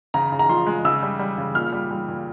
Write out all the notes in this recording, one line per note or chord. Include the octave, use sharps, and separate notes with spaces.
C#3 A#5
C#3
A#5
F3 C6
G#3
C#3 E6
G3
G3
C#3
A#2 F6
G3
G3
A#2